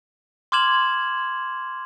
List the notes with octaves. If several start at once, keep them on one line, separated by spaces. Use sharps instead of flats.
C6 D6 F6 G#6 E7 F#7